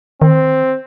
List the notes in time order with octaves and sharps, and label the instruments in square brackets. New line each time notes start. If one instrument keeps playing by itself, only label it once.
[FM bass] D#3 [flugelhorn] C4